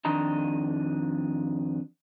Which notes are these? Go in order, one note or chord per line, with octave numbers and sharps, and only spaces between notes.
F2 D#3 D4 D#5 A#5